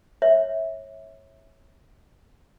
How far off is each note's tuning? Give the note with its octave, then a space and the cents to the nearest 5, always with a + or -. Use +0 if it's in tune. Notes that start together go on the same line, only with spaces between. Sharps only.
C#5 -20 E5 -15